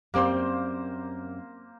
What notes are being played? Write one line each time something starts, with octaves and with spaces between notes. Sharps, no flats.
F#2 G3 A#3 C4 C5